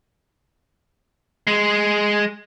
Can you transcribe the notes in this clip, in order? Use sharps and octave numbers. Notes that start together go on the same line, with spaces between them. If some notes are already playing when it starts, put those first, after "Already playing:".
G#3